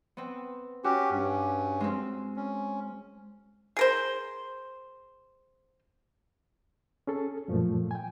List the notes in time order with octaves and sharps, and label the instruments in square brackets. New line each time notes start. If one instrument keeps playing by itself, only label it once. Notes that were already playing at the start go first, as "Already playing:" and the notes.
[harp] B3 C4
[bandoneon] C#4 G4 [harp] F#4
[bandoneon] G2 C#4
[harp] G#3 C4
[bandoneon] C#4
[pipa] G#4 A#4 C5
[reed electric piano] C#4 G#4 A4
F#2 A#2 F3 A3
G5 G#5